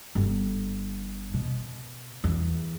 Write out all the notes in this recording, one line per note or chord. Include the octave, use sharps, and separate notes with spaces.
G1
B2
E2